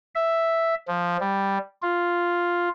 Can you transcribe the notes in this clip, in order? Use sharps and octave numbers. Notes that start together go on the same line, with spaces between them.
E5
F3
G3
F4